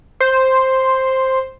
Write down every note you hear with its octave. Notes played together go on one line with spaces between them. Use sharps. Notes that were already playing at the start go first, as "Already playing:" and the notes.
C5